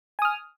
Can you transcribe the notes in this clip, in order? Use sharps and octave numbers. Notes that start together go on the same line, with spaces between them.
G#5 D#6 F6